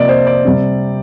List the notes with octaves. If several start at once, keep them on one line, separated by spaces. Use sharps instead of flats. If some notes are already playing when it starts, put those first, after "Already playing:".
Already playing: C3 F3 A#3 D5 D#5
C5
D5
C3 G3 C4